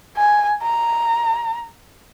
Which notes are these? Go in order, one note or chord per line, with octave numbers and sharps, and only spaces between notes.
G#5
A#5